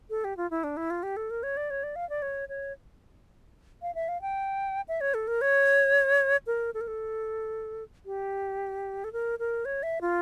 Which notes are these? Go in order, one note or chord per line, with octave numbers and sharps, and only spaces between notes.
A4
G4
F4
E4
D4
E4
F4
G4
A4
A#4
C#5
D5
C#5
D5
F5
D5
C#5
C#5
F5
E5
F5
G5
E5
C#5
A4
A#4
C#5
A#4
A4
A#4
A4
G4
A4
A#4
A#4
C#5
E5
F4